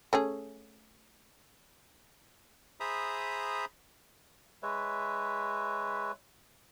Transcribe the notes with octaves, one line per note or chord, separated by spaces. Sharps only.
A3 C#4 G#4
G#4 C5 E5 A#5 B5 D#6
G#3 B4 C#5 E5